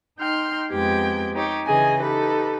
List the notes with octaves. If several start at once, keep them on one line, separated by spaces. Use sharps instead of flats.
D#4 G5 C6 F6
F2 G#3 B3 G4 G5 G#6
D#4 G4 C#5
C#3 E3 G#4 D#5 G#5
D#4 G4 A4 B4